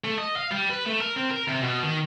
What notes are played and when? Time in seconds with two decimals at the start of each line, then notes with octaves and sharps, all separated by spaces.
0.04 A3
0.18 D#5
0.36 F5
0.51 G3
0.69 B4
0.85 A3
1.00 A#4
1.16 C4
1.31 A#4
1.48 C3
1.63 B2
1.83 D#3